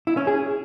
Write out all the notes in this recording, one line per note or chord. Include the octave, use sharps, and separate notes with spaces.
E4
C#4
G#4